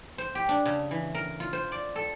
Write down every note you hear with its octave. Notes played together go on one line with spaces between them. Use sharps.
C5
G4
D4
C#3
E3
A#4
F4
C5
D5
A4